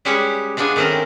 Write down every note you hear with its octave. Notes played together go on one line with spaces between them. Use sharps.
G3 G#3 C#4 G4 B4 C#5
G#3 B3 D4 F4 G#5
D#3 A3 C4 C#4 A#4